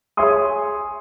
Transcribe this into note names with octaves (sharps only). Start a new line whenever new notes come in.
G#4 C#5 E5 G#5 C6 D#6